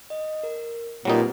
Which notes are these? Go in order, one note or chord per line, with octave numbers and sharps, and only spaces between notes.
D#5
A#4
A#2 F#3 G3 C4 D#4 G4 B4